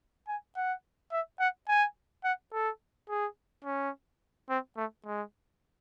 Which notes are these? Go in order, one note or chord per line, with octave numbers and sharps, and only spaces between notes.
G#5
F#5
E5
F#5
G#5
F#5
A4
G#4
C#4
C4
A3
G#3